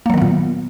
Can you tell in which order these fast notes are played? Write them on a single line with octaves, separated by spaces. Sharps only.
A#3 F#3 D#3 B3 A#2